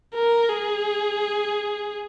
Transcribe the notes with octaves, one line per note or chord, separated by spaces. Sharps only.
A#4
G#4